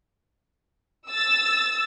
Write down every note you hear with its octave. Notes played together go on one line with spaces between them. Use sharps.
E6 A6